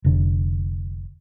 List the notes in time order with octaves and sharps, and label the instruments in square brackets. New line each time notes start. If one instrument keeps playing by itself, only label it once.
[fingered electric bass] F1 D3